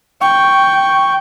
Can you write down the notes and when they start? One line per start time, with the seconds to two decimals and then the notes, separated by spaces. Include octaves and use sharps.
0.21 G5 C#6